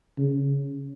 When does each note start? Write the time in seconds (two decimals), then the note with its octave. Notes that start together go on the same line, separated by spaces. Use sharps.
0.18 C#3